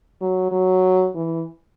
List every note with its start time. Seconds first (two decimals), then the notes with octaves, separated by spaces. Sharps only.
0.21 F#3
0.52 F#3
1.15 E3